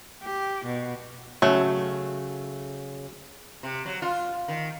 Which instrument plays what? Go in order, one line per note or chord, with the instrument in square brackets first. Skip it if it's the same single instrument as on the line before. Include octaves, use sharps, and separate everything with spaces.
[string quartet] G4
B2
[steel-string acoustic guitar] C#3 [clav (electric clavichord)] F#3 [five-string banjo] A3
[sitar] C3
F#3
F4
D#3